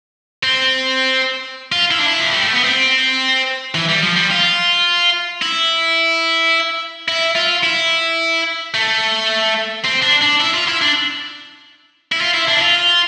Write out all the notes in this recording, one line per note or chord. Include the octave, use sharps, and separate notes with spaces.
C4
F4
E4
D4
E4
F3
G3
A3
B3
C4
E3
G3
F3
G3
F4
E4
E4
F4
E4
A3
C4
D4
D4
E4
F4
E4
D4
E4
F4
E4
D4
E4
F4